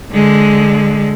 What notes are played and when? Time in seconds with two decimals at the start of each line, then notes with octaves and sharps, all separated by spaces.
0.12 D3 G#3